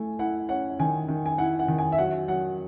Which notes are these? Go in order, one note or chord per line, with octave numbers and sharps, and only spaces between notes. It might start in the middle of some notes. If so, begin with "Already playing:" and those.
Already playing: A3 E4 G#5
E4 F#5
C#4 F#5
D#3 G#5
D#3
G#5
E4 F#5
F#5
D#3
G#5
E5
F#3 F#5
F#3 F#5